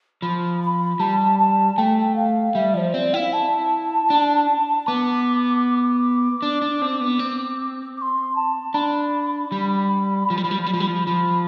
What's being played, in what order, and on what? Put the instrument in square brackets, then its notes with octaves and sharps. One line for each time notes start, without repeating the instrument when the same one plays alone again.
[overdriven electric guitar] F3 [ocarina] B5
[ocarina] B5
[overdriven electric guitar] G3 [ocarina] A5
[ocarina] A5
[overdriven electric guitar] A3 [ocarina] G5
[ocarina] F5
[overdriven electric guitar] G3 [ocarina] E5
[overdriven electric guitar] F3 [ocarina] D5
[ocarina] C5
[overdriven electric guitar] C4 [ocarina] D5
[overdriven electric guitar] E4 [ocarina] F5 G5
[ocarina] A5
[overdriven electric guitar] D4
[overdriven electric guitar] B3 [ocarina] D6
[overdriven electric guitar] D4
D4
C4
B3
C4
[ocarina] D6
C6
A5
[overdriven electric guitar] D4 [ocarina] B5
[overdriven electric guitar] G3
F3
G3
F3
G3
F3
G3
F3
G3
F3
[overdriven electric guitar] F3 [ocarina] B5